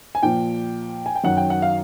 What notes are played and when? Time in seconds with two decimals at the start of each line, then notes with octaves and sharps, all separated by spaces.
0.15 G#5
0.23 A#2 F3 G5
1.06 G#5
1.15 G5
1.24 F#2 D#3 F#3 F#5
1.37 G5
1.50 F#5
1.62 F5